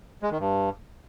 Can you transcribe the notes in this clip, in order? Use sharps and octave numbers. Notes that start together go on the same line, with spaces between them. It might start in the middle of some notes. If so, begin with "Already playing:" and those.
G#3
D#3
G2